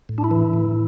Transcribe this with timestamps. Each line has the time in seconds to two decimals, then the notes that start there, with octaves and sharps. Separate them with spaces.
0.09 A2
0.18 D4
0.24 E4
0.31 E3
0.53 A2